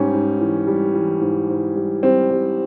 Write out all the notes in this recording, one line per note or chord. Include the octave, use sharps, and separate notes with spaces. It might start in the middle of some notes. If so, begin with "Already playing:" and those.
Already playing: G#2 G3 C#4
G#2
E3
G3
E3
G#2
G#2
G3
G3 C4
G3